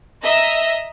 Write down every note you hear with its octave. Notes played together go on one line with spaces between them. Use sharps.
D#5 E5 A#5